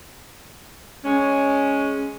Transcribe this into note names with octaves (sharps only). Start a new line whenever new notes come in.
G#3 C#4